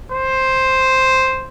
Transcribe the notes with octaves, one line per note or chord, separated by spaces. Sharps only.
C5